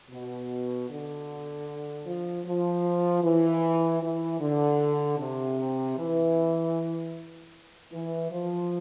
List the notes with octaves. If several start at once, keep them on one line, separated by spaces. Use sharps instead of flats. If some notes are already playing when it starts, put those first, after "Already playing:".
B2
D3
F3
F3
E3
E3
D3
C3
E3
E3
F3